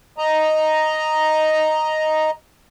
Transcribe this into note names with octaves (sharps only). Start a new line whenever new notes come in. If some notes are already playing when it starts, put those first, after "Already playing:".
D#5 A#5